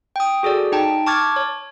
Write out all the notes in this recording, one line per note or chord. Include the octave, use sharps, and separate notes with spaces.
G5 D#6
F#4 G#4 A4 D5
D#4 G5 A5
A5 C#6 D6 F6 G#6 A6
C#5